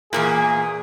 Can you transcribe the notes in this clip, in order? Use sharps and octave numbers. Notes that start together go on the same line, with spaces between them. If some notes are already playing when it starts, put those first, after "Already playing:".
E2 G2 A#2 G#4